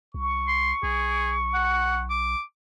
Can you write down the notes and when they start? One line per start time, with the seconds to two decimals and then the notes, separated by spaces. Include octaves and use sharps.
0.14 C2 C#6
0.48 C6
0.83 B1 G#4
1.54 F#5
2.10 D6